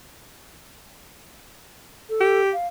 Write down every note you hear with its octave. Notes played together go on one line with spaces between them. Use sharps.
A4
G4
F5